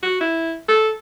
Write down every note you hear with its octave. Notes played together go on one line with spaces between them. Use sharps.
F#4
E4
A4